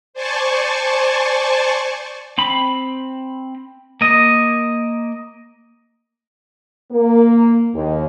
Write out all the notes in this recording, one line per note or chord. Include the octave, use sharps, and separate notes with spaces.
C5 D5 G#5 A5 C#6
C4 B5
A#3 D#5
A#3
D#2